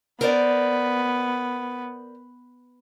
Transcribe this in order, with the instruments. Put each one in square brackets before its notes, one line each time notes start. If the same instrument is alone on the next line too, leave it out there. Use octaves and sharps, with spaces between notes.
[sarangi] B3 [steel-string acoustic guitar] A#4 C5 D5